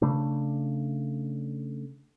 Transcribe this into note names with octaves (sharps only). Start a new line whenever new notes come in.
C#3 A3 D4